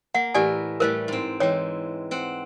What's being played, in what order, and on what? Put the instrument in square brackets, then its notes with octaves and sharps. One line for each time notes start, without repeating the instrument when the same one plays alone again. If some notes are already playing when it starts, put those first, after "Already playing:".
[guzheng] A#3 [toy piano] F#5
[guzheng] A2 E3 A#4 [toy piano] G4 D5 G#5
[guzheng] A2 G3 A3 [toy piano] A#4 C5
[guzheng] G#2 C4
[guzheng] E3 G#3 [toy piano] C#5 G5
[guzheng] C4 F#5